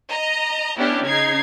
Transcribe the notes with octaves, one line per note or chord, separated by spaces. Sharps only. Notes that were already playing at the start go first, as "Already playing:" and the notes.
D#5 A#5
B3 C#4 D4 E4 G4
C#3 D#4 G#6 C7